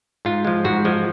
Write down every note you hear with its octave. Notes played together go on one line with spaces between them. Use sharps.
G#2 F4
F3 G#3
G#2 F#4
F3 G#3